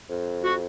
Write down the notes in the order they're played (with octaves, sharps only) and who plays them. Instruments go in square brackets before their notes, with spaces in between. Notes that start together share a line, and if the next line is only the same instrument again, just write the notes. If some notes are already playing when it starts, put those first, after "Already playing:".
[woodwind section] F2
F#4